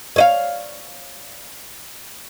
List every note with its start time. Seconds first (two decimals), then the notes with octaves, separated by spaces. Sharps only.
0.16 C#5 D#5 F5